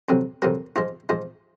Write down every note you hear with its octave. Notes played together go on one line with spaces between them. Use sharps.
F2 C3 F#3
F2 C3 F#3 A#4
G#2 F3 G#3 F4
G#2 F3 G#3 F4